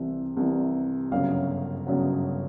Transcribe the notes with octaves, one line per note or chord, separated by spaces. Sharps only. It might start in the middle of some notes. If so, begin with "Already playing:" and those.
Already playing: C2 C3 E3
C2 C3 E3
G1 F#2 C#3 F#3 F5
G1 F#2 C#3 F#3